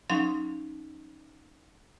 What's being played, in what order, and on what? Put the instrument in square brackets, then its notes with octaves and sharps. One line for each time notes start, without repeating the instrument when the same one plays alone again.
[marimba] F#3 C#4 D#4 F5 C6